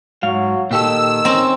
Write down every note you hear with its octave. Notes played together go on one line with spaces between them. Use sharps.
G#2 F#3 F5
A#2 D#3 G4 A4 E6
C4 C#4 D#4